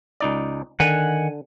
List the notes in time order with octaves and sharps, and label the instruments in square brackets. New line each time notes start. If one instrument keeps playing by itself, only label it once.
[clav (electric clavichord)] C#2 D#4 D5
[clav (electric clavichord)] D3 [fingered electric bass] D#3 [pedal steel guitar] F#5 G#5